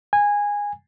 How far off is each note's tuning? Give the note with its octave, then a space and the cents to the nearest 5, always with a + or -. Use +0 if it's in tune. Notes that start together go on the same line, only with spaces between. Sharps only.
G#5 -15